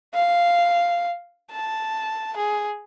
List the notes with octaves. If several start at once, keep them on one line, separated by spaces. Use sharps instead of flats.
F5
A5
G#4